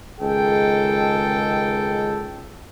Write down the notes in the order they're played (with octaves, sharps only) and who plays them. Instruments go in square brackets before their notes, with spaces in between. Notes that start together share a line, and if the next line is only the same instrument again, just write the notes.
[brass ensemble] C#2 D#3 G#4 A4 G5